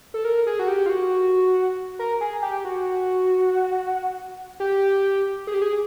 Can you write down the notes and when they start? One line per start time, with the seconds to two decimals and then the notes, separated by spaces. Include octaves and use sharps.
0.14 A4
0.25 A#4
0.47 G#4
0.59 F#4
0.68 G4
0.86 F4
0.89 F#4
1.99 A#4
2.21 G#4
2.42 G4
2.65 F#4
4.60 G4
5.47 G#4
5.54 G4
5.62 G#4